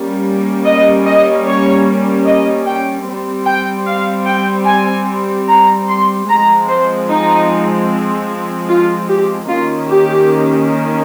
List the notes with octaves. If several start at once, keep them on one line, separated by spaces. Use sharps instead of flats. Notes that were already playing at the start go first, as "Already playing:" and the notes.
Already playing: G3 A#3 C#4
D#5
D#5
C#5
D#5
G5
G3 C4
G5
F5
G5
G#5
A#5
C6
F3 G#3 C4 A#5
C5
D#4
F4
G4
D#3 A#3 C#4 F4
G4